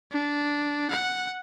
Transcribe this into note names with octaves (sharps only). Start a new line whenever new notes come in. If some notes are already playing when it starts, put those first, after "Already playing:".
D4
F#5